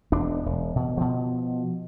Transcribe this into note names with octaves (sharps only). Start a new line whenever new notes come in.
E1 D4
E1
B2
B2 F3